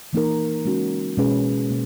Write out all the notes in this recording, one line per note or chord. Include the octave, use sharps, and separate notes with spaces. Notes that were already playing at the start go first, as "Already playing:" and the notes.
E3 A#3 D#4 A#4
G#3 C#4 F#4
B2 G#3 C#4 G#4 B4
B2 A#3